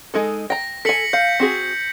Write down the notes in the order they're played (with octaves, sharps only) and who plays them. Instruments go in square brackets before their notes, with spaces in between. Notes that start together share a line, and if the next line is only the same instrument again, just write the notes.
[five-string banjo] G#3 D#4 A4
[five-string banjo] G5 A#5 [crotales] A#6
[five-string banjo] A4 G#5 [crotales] B6 C#7 F#7
[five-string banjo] F5 [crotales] G6 C#7
[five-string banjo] C4 F#4 G#4